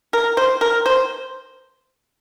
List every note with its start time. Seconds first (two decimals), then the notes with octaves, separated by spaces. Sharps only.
0.13 A#4
0.37 C5
0.61 A#4
0.86 C5